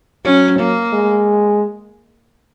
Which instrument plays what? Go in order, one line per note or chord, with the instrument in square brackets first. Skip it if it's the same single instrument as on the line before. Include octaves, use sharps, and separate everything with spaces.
[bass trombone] F#3 [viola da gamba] C#4
[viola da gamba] A#3
[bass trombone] G#3